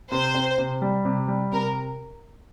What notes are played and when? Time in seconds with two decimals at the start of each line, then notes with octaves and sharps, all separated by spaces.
0.11 C3 C5
0.34 C4
0.58 C3
0.82 G3
1.05 C3
1.28 G3
1.52 C3 A#4